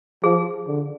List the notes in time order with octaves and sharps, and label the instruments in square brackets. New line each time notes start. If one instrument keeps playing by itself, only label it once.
[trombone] F3 [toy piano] G#4
[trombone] D3